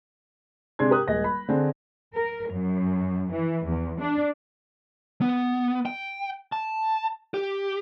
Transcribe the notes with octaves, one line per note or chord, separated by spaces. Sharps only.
C3 G#3 D4 C6 G#6
G4 A#4 D#6 F#6
D#1 G#3 D#5 A#6
B5
D3 C4 D4 G#4
A#4
F#2
E3
E2
D4
B3
G5
A5
G4